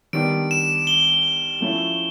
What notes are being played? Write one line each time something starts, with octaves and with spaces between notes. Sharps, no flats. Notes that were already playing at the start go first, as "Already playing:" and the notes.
D#3 G3 B3 D4 D7
E7
G7
F3 A3 C#4 E4